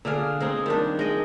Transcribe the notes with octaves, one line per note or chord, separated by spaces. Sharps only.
D3 D4 G#4 F5
G#3 C4 D#4 G#4
D#3 G3 D4
G#3 D#5 G5